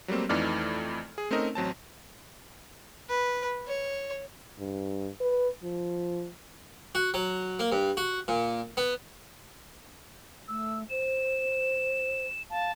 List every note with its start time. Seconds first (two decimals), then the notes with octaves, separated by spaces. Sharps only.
0.08 F#3 G3 A3 A#3 C4
0.29 F2 E3 A3 D#4 D5 F6
1.18 G#4
1.31 A3 C4 C#4 D#4 A#4 D#5
1.55 A1 F#3 C4 A5
3.10 B4
3.68 C#5
4.59 G2
5.20 B4
5.64 F3
6.95 F#4
7.14 F#3
7.59 A#3
7.72 G2
7.97 F#4
8.28 A#2
8.77 B3
10.48 A3 E6
10.90 C5 E7
12.50 F5 A5